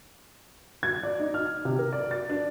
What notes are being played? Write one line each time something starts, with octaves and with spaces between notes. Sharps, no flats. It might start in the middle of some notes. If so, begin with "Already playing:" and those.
G#6
D5
D#4
F6
C3
A#4
D5
A6
D4